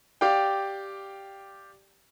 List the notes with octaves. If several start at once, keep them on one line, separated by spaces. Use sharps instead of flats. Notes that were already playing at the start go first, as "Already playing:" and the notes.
G4 D5 F5 G5